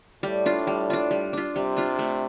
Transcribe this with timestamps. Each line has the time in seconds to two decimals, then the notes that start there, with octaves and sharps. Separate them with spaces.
0.23 A2 G3
0.46 D4 F4
0.67 G3
0.90 D4 F4
1.11 G3
1.33 D4 F4
1.55 C3 G3
1.77 D4 F4
1.99 A3